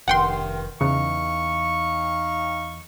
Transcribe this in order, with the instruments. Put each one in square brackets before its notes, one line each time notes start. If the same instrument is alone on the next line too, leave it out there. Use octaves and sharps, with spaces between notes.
[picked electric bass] F1 [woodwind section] G2 D#3 [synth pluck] F#5 G5 C6
[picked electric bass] E2 [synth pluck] C#3 [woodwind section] D#4 F5 C#6